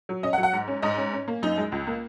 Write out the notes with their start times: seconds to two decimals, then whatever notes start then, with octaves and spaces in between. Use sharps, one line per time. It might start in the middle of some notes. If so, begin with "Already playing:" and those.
0.09 F#3
0.23 C#4 D#5
0.33 F#5
0.38 F#3
0.43 F#5
0.53 G#2
0.68 C#4
0.82 G#2 D#5
0.97 C#4
1.13 C#4
1.28 A#3
1.43 F#2 D#4
1.58 G#3
1.72 C#2
1.87 A#3